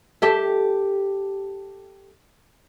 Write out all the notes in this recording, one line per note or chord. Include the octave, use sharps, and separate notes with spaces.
G4 A4 E5